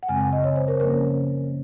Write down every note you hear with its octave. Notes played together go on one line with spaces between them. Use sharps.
F#5
F#2 C#3 G#3 C4 G#5
F#5
D#5
C#5
C5
A#4
C#3 F3 A#3 C#4 A#4